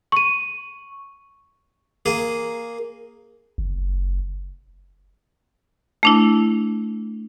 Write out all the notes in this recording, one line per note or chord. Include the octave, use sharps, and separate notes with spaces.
C#6 D#7
A#3 G#4
F#1
A3 D4 E4